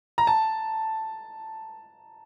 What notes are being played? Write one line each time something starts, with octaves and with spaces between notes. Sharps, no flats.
A#5
A5